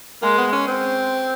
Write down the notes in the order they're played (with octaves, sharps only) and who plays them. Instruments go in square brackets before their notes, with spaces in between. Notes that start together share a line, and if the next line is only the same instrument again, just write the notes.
[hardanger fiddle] G#3 [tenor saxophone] A#3
[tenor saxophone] B3
C#4
C4